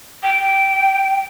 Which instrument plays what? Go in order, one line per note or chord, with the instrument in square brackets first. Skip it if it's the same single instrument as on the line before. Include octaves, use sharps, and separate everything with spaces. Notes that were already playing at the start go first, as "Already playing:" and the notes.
[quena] G5